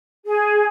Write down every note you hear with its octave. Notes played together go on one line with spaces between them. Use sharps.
G#4